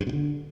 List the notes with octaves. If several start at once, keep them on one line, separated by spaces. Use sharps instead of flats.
G2
B2
D3